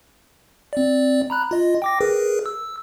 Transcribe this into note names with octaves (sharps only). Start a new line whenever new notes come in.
C4 D5
A#5 B5 F#6
F4 D#5
G5 D6 A#6
G#4 A#4 B4
E6